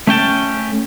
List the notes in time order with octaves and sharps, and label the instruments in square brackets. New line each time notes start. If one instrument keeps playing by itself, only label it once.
[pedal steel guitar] A3 C#4 G5 A5